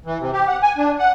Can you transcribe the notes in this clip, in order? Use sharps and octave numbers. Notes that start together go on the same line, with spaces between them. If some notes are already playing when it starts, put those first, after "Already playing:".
E3
C3
G4
F#5
G#5
D4
F#5